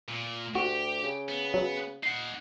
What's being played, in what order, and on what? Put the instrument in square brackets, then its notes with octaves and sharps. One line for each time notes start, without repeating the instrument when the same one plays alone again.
[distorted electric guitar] A#2
[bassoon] D2 [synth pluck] F#4 [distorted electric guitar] G4
[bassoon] C#3
[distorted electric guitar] B3
[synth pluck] F#3
[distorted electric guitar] D#4 F#5 [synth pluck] C7